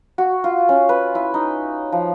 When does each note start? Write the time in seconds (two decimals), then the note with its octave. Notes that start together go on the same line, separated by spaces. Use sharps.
0.18 F#4
0.44 F4
0.69 C#4
0.89 B4
1.15 E4
1.34 D#4
1.92 F3